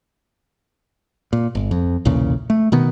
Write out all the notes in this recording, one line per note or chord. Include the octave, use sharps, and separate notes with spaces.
A#2
G1
F2
B1 E2 A#2 C#3
A3
B2 D#3 B3